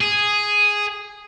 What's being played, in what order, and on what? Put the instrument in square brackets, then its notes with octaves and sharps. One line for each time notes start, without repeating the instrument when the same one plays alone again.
[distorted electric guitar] G#4